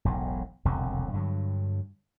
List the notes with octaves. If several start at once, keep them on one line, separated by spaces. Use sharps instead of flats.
E1 B1 A2
E1 C2 F2 D3
G2 D3 F#3